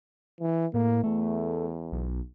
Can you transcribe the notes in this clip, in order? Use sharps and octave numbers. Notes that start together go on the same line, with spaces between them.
E3
A2 A#3
E2 A3
B1